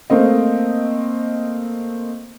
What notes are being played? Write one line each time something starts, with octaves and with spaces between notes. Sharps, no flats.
A3 A#3 C4 D#5